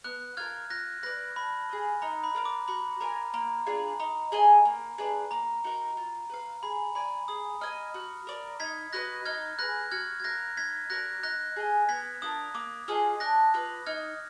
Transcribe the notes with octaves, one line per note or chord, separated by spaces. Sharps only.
B3 F#6
F4 A#4 F6 G#6
F4 F#6 A#6
B4 D5 F#6 A#6
D4 B5
G#4 D#5
D#4 A#5
B5
A#4 D5 F5
D6
F#4 B5
A#4 F5 G#5 A#5
A#3 A#5
D4 F4 G#4
D#4 A#5
G#4 D#5 G#5
A#3
D4 G#4 B4
A#3 A#5
D#4 F#4 A#4
F4
B4 F5
G#4 B5
D5 G#5 B5
G#4 D#6
D#5 G#5 F6
F#4
A#4 D5
D#4 G#6 B6
F#4 B4 D#5 F#6 A#6
D#4 F6 G#6
G#4 B4 F#6 A#6
F#4 F6 G#6
G#6
A#4 F5 F#6 A#6
D#4 G#6 B6
F#4 A#4 D5 F#6 A#6
D#4 F#6 A#6
G#4 D#5 G#5
B3 G#6 B6
D4 F4 A#4 D#6
A#3 D6
F4 G#4 D#5 D#6
D4 F#6 A#6
F4 B4
D#4 F6 G#6